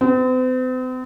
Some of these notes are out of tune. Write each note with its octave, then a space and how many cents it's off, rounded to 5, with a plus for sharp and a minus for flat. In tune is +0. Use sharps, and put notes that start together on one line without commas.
C4 -45